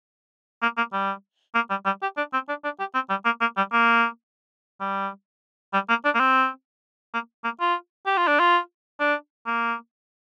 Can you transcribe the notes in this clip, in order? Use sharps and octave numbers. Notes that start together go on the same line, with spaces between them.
A#3
A#3
G3
A#3
G3
G3
G4
D4
C4
D4
D4
G4
C4
G3
A#3
A#3
G3
A#3
G3
G3
A#3
D4
A#3
C4
A#3
A#3
F4
G4
F4
D4
F4
D4
A#3